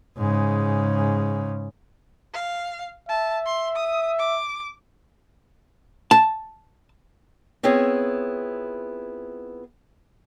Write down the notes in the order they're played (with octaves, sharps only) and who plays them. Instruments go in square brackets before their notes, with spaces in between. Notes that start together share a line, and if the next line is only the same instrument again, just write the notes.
[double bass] G#2 C#3
[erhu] F5
[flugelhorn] E5 [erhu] A5
[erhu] C6
D#6
D6
[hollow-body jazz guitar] A5
[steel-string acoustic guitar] B3 C4 E4 F4 G#4 C#5